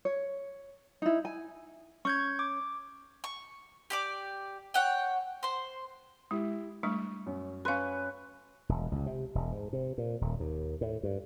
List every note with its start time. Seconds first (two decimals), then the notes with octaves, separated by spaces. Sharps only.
0.05 C#5
1.02 D#4 E4
1.25 G#5
2.05 C#4 C#6 G6 G#6
2.39 D6
3.24 C#6
3.90 G4 D5 D6
4.74 C#5 F#5 G5
5.43 C5 C6
6.31 G#3 E4 G4
6.83 G3 A3 D4 C#6
7.26 F#2
7.65 C#4 B4 F5 C6
8.69 E1
8.92 C#2
9.06 C3
9.35 E1
9.52 G#2
9.73 C3
9.98 A#2
10.21 D#1
10.40 D#2
10.81 A2
11.03 G2